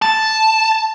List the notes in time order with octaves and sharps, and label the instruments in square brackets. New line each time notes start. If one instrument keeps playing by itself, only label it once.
[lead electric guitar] A5